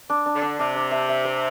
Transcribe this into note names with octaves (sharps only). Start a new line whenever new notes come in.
D4
D4
D3
D4
C3 D4
D4
E5
E5
C5